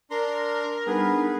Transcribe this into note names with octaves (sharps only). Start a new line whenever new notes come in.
D4 A#4 A#5 C6
G3 B3 D4 D#4 G#4 B4